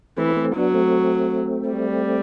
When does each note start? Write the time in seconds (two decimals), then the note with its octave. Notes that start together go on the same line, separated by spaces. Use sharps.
0.18 E3 A3 C4
0.36 A3 C4
0.55 F#3 B3 D4
0.74 A3 C4
1.69 G3